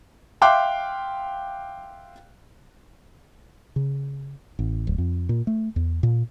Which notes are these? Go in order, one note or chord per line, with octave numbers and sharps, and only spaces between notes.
E5 F5 G5 C6 D6 F#6
C#3
A1
D1
F2
A#2
A3
E2
A#2